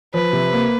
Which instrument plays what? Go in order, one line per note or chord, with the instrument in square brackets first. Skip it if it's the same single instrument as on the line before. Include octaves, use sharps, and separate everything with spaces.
[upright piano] F3 [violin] B4
[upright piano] C3
A#3